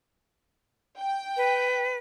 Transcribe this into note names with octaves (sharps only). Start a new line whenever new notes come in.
G5
B4